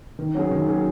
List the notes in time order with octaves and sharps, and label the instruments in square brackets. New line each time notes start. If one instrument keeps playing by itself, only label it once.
[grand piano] D#3
F#3 C#4 G#4
D#3
F#3 C#4 G#4